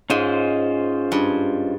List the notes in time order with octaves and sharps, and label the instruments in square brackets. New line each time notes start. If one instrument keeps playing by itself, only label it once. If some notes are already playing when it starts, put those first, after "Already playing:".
[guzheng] G#2 [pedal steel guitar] C#4 F4 C5 D#5
[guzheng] G2